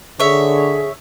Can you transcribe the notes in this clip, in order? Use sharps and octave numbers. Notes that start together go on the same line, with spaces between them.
D3 G#4 C#5 E5